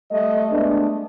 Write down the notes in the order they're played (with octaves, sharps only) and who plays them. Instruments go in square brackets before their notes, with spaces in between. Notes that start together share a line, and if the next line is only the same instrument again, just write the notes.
[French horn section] G3 A3 D#5
G#3 A3 B3 D4